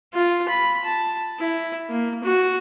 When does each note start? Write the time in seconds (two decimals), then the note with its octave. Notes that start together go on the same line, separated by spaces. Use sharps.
0.14 F4
0.49 B5
0.84 A5
1.40 E4
1.90 A#3
2.23 F#4